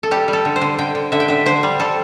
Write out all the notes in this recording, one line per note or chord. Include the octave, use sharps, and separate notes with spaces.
A4
G3 G4
G3
A4
D3
C5
D3
D3 G5
D3
D3 E5
G5
D3 E5
D3 C5
G3
G3 A4